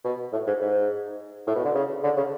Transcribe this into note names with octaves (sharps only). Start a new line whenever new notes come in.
B2
A2
G#2
G#2
A2
B2
D3
C#3
D3
C#3